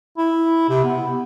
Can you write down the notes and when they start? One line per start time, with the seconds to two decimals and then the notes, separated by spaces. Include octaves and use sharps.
0.18 E4
0.69 C3
0.84 B3